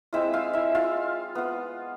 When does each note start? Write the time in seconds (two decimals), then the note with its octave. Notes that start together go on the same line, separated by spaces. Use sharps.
0.13 G#3 C4 E4 F4 E5
0.34 F4 F5
0.53 E4 E5
0.75 F4 F5
1.35 B3 F4